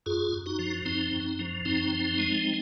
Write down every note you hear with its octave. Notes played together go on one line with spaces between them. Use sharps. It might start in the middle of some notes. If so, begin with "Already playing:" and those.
F#2 F4 G#4
F#2
D#4 F#4
F3
F#2 C4 D#4
F#2
F3
F#2 C4 D#4
F3
G#3